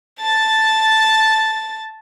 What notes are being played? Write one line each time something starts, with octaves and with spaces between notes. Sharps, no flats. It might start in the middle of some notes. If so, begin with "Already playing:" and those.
A5 A6